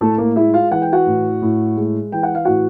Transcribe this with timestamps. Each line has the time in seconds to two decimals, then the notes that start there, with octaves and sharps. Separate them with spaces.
0.01 A2 A3 A4
0.18 A#3 A#4
0.36 G#3 E4 E5
0.54 F4 F5
0.71 E3 F#5
0.82 G5
0.92 F#4 F#5
1.07 A2
1.42 A2
1.77 G#3
2.12 E3 G5
2.23 F#5
2.35 F5
2.45 A2 F#4 F#5